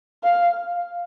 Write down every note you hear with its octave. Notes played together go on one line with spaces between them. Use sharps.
F5